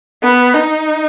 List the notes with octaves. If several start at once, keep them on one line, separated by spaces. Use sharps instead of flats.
B3
D#4